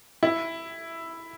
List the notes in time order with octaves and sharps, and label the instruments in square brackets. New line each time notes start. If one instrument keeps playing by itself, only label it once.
[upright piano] E4